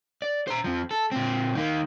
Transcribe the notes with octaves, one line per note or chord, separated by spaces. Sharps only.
D5
C5 A#5
F2 F3
A4
A#2 C4
D#3 A#3